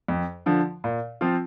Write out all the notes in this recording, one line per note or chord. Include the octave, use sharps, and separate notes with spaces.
F2
D3 F3
A#2
F3 C4 F4